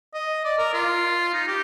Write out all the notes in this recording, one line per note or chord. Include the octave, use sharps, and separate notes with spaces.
D#5
D5
A#4
F4
D#4
G4